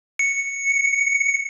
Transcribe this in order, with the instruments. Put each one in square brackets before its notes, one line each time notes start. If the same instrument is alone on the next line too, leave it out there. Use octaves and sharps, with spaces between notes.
[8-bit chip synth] C#7